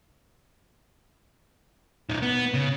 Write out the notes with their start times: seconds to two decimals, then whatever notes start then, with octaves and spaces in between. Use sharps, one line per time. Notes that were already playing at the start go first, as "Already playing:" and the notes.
2.10 B1 D#3
2.22 B3
2.54 C#3